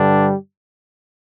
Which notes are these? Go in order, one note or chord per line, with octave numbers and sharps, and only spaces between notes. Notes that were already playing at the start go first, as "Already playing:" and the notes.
Already playing: G2 D3 G3 D4